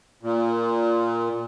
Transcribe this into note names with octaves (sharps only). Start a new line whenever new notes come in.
A#2